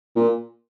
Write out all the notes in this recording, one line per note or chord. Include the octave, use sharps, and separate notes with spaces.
A#2